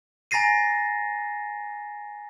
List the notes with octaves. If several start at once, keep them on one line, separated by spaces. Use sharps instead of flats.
G#5 A#5 A6 A#6 C7 D#7